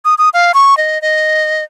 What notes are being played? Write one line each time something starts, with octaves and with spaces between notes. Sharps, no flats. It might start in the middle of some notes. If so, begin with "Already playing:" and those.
D#6
D#6
F5
C#6
D#5
D#5